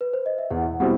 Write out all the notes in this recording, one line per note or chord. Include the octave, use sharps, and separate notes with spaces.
B4
C5
D#5
E5
E2 F#5
B2 G3 C4 E4 F#5